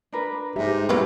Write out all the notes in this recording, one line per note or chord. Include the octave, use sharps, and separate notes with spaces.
D4 A#4 B4
G#2 G4 A#4 E5
A#4
F#3 B3 C#4 E4 F4 G4 A4 B4